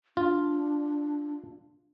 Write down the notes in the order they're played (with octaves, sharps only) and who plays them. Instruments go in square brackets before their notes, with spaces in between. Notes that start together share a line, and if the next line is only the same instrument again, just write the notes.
[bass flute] D4 [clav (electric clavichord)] F4